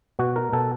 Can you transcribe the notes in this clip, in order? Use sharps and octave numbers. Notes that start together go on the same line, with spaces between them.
B2 F#4
A#4
B2 A4